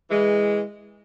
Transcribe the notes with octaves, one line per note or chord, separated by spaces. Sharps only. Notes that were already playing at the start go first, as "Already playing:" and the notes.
E3 G#3